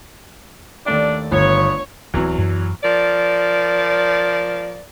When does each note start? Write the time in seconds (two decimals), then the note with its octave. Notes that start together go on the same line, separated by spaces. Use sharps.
0.86 D#2 A3 D4 D5
1.32 G1 B3 C#5
2.14 D1 E2 E3 F#3 C4
2.39 F#2
2.83 F3 A#4 D5